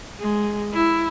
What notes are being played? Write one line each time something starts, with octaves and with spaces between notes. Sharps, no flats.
G#3
E4